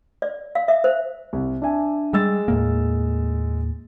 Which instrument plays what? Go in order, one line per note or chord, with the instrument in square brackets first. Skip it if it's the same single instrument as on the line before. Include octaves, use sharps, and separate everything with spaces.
[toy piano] D5
F5
E5
C5
[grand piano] C2
D4 E5 G#5
[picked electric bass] G3 [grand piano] G#3 E6 A6
[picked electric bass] D#2 A2 A#3